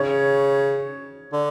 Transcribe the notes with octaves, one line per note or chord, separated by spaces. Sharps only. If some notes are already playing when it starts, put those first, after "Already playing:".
Already playing: C#3 C#5
D3